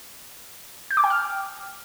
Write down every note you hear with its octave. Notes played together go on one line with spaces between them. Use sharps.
G6
D6
G5
F6